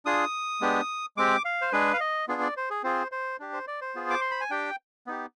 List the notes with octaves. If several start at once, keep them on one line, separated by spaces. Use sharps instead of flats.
D4 F4 G#4 D#6
G#3 B3 D4 G4
G#3 C4 G4 D6
F5
C5
G#3 D4 G#4 B4
F5
D#5
B3 D4 F4 G#4
D5
C5
G#4
C4 F4 G#4 C5
C5
D4 G4
C5
D5
C5
B3 F4 G#4
D6
C6
B5
G#5
D4 G4 G5
B3 D#4 G4